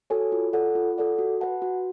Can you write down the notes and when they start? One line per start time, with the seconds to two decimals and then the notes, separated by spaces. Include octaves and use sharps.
0.10 F#4 A4 C#5 G#5
0.32 F4
0.53 A4 D5 F#5
0.75 F4
0.98 A4 D5 F#5
1.19 F#4
1.41 B4 F#5 A5
1.62 F#4